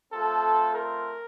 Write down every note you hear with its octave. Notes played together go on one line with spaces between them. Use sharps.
A3 C4 F4 A4
A#4